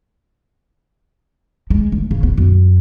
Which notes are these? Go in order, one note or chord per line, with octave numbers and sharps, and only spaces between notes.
G#3
D2
C#3
B3
F#2